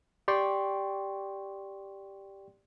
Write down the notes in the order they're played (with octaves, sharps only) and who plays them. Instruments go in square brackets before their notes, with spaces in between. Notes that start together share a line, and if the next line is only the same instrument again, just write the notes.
[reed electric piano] G4 D5 G5 C6 C#6